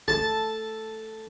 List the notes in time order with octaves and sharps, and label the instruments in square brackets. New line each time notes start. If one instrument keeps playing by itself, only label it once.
[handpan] A4 [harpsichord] A5